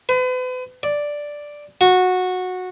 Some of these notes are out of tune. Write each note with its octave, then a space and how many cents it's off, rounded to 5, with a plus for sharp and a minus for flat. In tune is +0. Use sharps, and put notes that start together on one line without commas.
B4 +40
D5 +0
F#4 -15